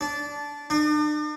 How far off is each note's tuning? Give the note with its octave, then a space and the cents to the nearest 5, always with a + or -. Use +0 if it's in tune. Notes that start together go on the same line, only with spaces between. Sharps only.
D4 -15
D4 +45